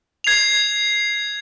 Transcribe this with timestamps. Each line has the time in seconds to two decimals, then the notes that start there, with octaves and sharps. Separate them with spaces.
0.24 G#6 C7 F7